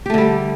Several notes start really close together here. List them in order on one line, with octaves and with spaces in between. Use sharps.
G4 A3 D3 G3